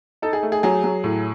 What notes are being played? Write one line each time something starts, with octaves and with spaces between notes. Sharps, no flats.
D#4 A4
G#4
A3
G#4
F#3 G#4
F#3
A2